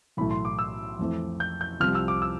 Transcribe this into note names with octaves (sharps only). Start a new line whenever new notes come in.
B1 A2 E3 A3 B5
C6
D6
E6
F2 E3 A3 C4
G6
G6
C2 C3 F3 F6
E6
D6
E6